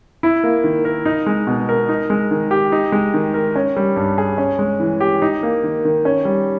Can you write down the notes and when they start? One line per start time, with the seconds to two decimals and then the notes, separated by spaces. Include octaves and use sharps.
0.23 E4
0.43 A#3
0.64 D#3
0.85 A#4
1.05 D#4
1.26 G#3
1.47 B2
1.69 A#4
1.89 D#4
2.10 G#3
2.31 D#3
2.51 G4
2.72 D#4
2.92 G#3
3.14 D#3
3.34 A#4
3.56 C#4
3.76 G3
3.96 G2
4.18 G#4
4.38 C#4
4.59 G#3
4.80 E3
5.00 G4
5.22 D#4
5.43 A#3
5.63 D#3
5.85 D#3
6.05 C#4
6.25 G3